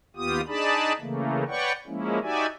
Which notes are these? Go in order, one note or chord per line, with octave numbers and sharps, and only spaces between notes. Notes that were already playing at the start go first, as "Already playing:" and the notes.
D#2 B3 F4 G4 D#6
D4 D#4 G#4 D5 A5 B5
C#3 E3 A3 A#3
B4 C#5 D5 F#5 G5 C#6
F3 G#3 A#3 C#4 E4
D#4 F#4 G4 D5 E5 G#5